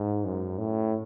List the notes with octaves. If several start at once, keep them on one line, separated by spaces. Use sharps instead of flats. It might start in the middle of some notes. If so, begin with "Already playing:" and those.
Already playing: G#2
F#2
A2